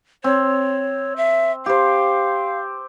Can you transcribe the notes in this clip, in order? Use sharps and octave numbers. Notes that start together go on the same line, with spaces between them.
C4 C#5
E5
G4 C5 F5